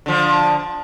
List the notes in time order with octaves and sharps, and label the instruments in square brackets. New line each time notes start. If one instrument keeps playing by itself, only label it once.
[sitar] D3 F3